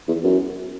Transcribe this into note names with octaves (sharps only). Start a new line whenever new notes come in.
E2
F#2